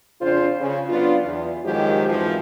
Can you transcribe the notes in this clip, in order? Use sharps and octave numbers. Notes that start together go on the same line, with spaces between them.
F2 C#3 D4 F4 C5
C#3
F#3 B3 D4 F4
E2
F#2 D#3 F3 F#3 G#3 G4
F2 G#2 E3 F3